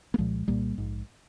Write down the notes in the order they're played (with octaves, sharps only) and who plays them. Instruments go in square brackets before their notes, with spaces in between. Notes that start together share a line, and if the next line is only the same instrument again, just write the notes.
[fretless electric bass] A#3
C2 A#2 F3 G#3
C2 A#2 G3 A#3
A#1 G#2